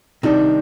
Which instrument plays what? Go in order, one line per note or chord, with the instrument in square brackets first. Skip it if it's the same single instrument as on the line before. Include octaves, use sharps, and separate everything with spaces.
[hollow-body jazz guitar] C3 D#3 G3 D4 [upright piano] D#4